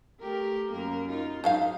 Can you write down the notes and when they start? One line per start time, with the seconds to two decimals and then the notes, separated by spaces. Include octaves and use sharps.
0.20 A3 G4 A#4
0.71 F#2 A#3 A#4
1.09 D#4 F4
1.44 G#2 F#3 G#3 D#4 F5